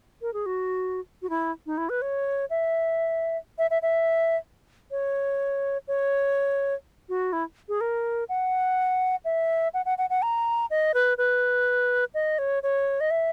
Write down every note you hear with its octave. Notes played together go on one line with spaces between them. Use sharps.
A#4
G#4
F#4
F#4
E4
D#4
E4
B4
C#5
E5
E5
E5
E5
C#5
C#5
F#4
E4
G#4
A#4
F#5
E5
F#5
F#5
F#5
F#5
A#5
D#5
B4
B4
D#5
C#5
C#5
D#5
E5